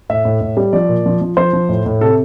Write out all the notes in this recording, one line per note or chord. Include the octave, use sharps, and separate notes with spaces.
A2 E5
A2
A2
G3
F3 D5
A#2
F3
F3
F3 C5
F3
A2
A2
C3 A4